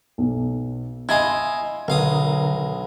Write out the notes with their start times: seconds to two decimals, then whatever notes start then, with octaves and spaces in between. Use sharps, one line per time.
0.18 B1
1.09 E4 D#5 F5 G#5 C6 G#6
1.88 B1 D3 A#4 F5 D#6